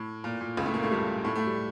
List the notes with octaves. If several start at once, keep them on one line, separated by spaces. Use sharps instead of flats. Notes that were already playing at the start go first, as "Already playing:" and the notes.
Already playing: A2
A#2
A#2
C#2 C#3
A2 A3
A#2 A#3
A2 A3
G2 G3
A2 A3
A2 A3
G3